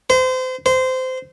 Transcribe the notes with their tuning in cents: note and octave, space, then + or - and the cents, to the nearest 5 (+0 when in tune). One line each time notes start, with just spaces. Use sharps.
C5 -30
C5 -20